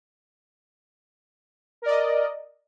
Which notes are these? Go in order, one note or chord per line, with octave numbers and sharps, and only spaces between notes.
A#4 D5 D#5